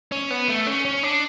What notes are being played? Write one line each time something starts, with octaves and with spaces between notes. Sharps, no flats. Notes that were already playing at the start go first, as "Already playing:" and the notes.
C#4
B3
A3
C#4
C#4
D4